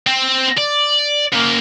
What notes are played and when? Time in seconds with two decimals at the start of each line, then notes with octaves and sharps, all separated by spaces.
0.07 C4
0.58 D5
1.33 C#3 A#3